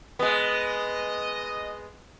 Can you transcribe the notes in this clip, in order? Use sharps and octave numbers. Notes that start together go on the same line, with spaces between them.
G#3 B3 D#5